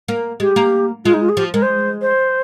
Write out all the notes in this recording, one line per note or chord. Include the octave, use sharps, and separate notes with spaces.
A#3
G#3 G4
A#3
G#3 F4
D#4
F4
G#4
F3 G4
G#3 A#4
C5
C5